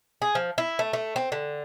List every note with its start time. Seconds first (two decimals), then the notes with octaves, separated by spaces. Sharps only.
0.22 G#4
0.35 F3
0.58 E4
0.79 A3
0.93 A3
1.16 C4
1.32 D3